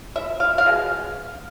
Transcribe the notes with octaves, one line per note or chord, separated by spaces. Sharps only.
E5
F5
F5
B2 G#3